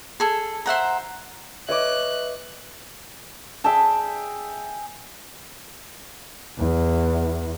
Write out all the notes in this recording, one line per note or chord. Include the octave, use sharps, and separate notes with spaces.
G#4 A4
C5 E5 F#5 A#5
B4 C#5 D#5 E5 D6 F#6
G#4 E5 G5 A5
E2